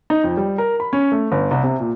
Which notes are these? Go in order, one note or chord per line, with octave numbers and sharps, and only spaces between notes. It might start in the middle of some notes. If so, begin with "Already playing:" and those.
D#4
F2
G3
A#4
B5
C#4
A3
G1
C2
C3
A#2